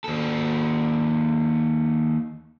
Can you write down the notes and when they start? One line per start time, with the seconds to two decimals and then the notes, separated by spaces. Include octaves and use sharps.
0.04 D#2 A4